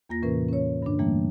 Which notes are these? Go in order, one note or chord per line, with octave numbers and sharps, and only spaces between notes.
E2 A#3 F4 A#6
A2 C3 E3 C#4 A#4 B4
C#4 C#5
G2 D3 D4
E3 G3 A3 A#3